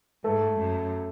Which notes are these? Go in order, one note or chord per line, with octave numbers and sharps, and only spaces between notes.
G#2 A3 A4
F#2